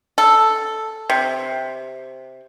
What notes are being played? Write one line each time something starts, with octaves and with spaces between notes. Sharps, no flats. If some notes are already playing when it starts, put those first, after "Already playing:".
A4
C3